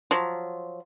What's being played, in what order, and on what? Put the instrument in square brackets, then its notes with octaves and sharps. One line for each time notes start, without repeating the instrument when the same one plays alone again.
[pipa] F3 F#3